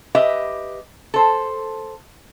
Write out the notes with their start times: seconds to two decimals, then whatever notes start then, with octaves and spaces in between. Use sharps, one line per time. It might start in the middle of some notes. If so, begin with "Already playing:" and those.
0.15 G4 B4 D#5 E5
1.14 A4 C5